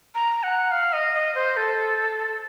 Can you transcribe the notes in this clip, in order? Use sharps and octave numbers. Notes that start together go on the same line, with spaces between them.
A#5
F#5
F5
D#5
D#5
C5
A4